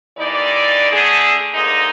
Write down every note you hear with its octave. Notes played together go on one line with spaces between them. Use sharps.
D#2 E3 D#4 D5
D3 A3 G#4
D2 G#3 A#3 D#4 G#4 D#5